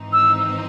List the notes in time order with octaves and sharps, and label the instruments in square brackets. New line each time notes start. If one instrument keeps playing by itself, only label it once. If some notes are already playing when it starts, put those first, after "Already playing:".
Already playing: [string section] G#1 G#2 E3 C4 D#4
[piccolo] E6